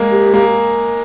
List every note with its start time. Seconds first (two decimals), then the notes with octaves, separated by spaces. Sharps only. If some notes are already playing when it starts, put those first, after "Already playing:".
Already playing: G#3 A#3
0.10 G4
0.34 A#3